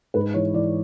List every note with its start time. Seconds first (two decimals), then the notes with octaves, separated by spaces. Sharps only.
0.14 G#2 B4
0.34 E3 C#5
0.54 E3 D5